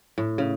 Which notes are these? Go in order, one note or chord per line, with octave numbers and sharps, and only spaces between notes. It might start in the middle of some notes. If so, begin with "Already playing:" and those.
A2
C#3